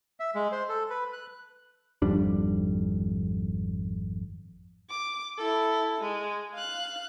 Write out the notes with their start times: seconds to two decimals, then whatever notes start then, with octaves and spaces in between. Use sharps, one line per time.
0.20 E5
0.35 G#3
0.52 C5
0.69 A4
0.90 B4
1.13 F#6
2.02 G#1 F2 G3 D4
4.90 D6
5.38 E4 A4
6.01 G#3
6.55 F5 F#6